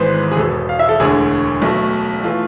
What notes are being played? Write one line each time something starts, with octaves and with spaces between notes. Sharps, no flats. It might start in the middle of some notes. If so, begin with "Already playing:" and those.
Already playing: G#1 G#2 E3 G#3 B3 B4 C5
G#4
E1 E2 B2 B3 A4
F5
E5
A4
E1 D2 D3 G#4
B1 B2 A3
E3 A3 F4